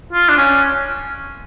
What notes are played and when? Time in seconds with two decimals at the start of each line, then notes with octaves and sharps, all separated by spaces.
0.13 F4
0.29 D4
0.38 C#4